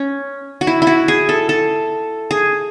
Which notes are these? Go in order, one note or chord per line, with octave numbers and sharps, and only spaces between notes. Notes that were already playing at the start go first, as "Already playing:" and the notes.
Already playing: C#4
F#4
E4
E4
F#4
G#4
A4
A4
G#4